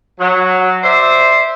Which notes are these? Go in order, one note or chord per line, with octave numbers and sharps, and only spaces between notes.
F#3
C5 D5 E5